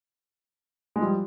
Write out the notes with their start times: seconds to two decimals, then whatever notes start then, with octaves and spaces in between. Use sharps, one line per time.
0.96 G#3
1.01 F3 G3